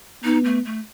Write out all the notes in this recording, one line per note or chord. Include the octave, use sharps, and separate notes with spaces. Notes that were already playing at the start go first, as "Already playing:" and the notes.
B3 D#4
A3
A3